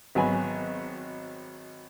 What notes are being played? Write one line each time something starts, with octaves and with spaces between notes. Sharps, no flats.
G#1 F#3 B3 G#5 B5